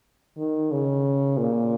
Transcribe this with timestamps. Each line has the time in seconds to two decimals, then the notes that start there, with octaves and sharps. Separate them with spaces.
0.37 D#3
0.72 C#3
1.38 A#2